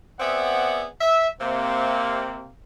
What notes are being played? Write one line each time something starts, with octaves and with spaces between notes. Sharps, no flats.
B3 C4 G#4 D5 E5 F#5
E5
C3 A#3 C4